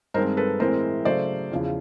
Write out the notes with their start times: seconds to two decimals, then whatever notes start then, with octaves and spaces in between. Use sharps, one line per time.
0.14 G2 D#3 G#3 C4 A#4 C5
0.37 A4 B4
0.60 A2 E3 G#3 C4 E4 A#4 C5
1.05 C#3 F#3 A3 C5 D5
1.52 E2 C#3 F3